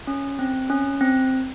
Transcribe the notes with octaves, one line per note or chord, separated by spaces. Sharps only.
C#4
C4
C#4
C4